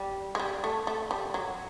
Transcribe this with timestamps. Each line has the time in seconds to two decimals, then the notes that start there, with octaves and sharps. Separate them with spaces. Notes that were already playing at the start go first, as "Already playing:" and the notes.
Already playing: G3
0.35 G#3
0.40 G3
0.64 A3
0.87 A3
1.11 G3
1.34 F#3